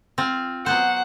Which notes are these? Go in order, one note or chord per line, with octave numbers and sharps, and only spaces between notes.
C4 F4
F#3 B3 C5 F#5